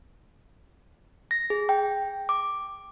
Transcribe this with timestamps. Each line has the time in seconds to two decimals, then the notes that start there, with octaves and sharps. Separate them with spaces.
1.31 A#6
1.50 G#4
1.69 G5
2.29 D6